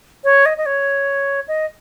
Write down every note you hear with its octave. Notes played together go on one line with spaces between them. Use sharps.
C#5
D#5
D#5
C#5
D#5